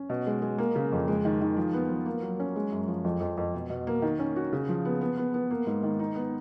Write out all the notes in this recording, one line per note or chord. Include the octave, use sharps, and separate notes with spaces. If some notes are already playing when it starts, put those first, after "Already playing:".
Already playing: C#4
B2
G#3
G#3
A#3
C#3
F2
G#3
D#3
D#3
F3
B3
F3
A#3
F#3
C#4
G#3
F#2
F3
F2
F2
F2
B2
B2
A#3
D#3
C#4
F#4
C#3
F3
B3
B3
B3
B3
A#3
G#2
D#3
D#4
B3